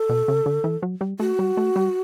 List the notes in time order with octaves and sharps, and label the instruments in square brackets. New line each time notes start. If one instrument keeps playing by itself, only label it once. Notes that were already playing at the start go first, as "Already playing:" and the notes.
Already playing: [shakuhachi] A4
[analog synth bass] B2
C#3
D3
E3
F#3
G3
[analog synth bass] A3 [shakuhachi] F#4
[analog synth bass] G3
A3
G3